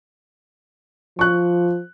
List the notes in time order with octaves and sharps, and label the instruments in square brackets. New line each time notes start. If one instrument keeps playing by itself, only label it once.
[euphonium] F3 [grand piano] C#6 F#6